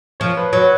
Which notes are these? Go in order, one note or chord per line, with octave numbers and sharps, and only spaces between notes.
F3 C#5
B4
F#3 B4